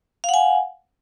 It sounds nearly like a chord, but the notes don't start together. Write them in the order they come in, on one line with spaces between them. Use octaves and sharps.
F5 F#5 G#5